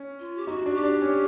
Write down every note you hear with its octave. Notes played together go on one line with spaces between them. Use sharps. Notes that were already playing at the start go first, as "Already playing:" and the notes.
Already playing: C#4
F4
G4
D#4 F#4
D4
G4
D4
C#4